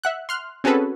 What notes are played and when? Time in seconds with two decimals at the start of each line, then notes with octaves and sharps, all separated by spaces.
0.04 E5 F#5 F#6
0.29 C6 F6 F#6
0.64 C4 C#4 F#4 G#4 A4 B4